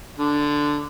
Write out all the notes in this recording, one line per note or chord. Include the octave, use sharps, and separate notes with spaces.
D3